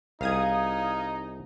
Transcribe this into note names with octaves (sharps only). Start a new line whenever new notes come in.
C2 D#4 G#4 F5 D#6 G#6